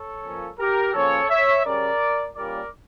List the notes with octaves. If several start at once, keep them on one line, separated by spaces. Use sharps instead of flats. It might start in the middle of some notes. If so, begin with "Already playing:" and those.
Already playing: A4 C#5
A#2 F3 A#3 C#4
G4 A#4
C#3 F3 A#3 C#4 A4 C#5
C#5 E5
C#3 G3 C#4 A#4 D5
A#2 G3 A#3 C#4 A#4 D5